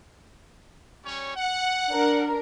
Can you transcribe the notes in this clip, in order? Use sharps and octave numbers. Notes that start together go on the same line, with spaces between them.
G3 C#4 C#5
F#5
D4 A#4